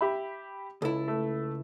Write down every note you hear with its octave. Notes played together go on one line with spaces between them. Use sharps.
G4 E5 B5
C#2 E4 A4
A3